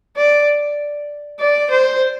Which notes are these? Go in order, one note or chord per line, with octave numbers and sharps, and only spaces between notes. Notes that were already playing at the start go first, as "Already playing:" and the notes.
D5
D5
C5